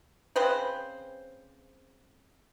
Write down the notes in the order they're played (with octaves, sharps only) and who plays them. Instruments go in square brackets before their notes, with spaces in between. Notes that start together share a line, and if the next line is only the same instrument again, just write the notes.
[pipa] C#3 C4 B4 C5